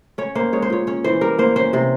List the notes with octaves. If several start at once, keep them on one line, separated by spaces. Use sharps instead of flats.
C#4 C#5
A#3 C5
G#3 C#5
C5
A#2 C#5
C#4 C#5
E3 C5
G3 A#4
A#3 C5
C#4 C5
C3 C5